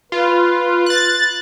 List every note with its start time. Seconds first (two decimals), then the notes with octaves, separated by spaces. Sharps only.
0.12 F4 B4
0.86 F#6 A6